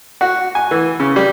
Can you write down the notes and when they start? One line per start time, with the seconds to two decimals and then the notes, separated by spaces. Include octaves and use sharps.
0.21 F#4
0.55 G#5
0.71 E3
1.00 C#3
1.16 G3